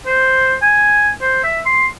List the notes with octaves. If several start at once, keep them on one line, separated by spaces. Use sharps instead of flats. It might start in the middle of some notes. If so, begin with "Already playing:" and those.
C5
G#5
C5
E5
C6